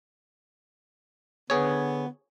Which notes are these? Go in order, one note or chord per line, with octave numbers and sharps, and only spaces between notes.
D3 B3 G#4 C#5